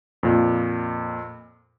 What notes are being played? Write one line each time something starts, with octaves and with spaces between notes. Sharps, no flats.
F2 A#2